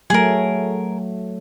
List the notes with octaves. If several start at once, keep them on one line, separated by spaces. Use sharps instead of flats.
F#3 A3 G#4 A#4